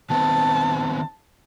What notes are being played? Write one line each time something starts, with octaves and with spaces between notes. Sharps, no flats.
D#3 B3 C4 A5